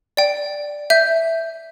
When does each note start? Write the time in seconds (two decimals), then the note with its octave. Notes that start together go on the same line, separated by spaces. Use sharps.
0.17 D5 G5
0.90 E5 G6